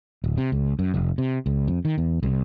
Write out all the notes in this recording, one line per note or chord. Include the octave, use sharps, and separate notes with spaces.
D1
C3
C#2
F#2
F1
C3
C#2
F2
D#3
E2
C2